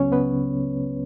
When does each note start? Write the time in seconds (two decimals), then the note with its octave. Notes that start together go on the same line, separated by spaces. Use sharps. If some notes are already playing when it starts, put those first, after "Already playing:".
Already playing: C#2 C#3 F#3 B3 C#4 C#5
0.12 B3 B4